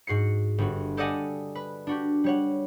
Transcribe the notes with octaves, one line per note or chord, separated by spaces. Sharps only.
G#2 F#4 C7 C#7
G1 F#4
G4 A4 D5 D#5 F#5 G#5
B4
D4 F#4 G4
G3 C#5 F#5